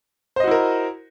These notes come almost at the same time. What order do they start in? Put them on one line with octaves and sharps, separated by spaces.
C5 D#5 F#4 E4 A#4